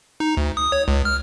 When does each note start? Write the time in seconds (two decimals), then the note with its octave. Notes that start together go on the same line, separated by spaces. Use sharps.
0.20 D#4
0.37 D2
0.57 D#6
0.72 C#5
0.88 C#2
1.05 F6